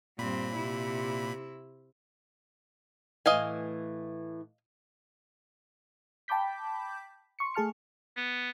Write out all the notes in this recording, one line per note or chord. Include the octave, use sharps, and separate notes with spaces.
G2 A#2 C4 B5
C3 E4
A2 E3 D#5 F5 G#5
G5 A5 B5 D6 G6 B6
C6 C#6 C#7
A3 G#4 A5 F6 C#7
B3